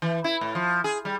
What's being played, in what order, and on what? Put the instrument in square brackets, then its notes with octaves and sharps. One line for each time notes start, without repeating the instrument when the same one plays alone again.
[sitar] E3
E4
A2
F3
G#4
G3